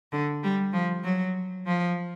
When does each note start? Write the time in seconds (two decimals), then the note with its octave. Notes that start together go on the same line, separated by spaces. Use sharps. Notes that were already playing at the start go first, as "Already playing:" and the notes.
0.12 D3
0.43 G3
0.73 F3
1.04 F#3
1.66 F3